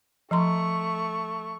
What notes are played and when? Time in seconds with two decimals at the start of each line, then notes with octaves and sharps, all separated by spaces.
0.31 F3 A3 A#5 C6 C#6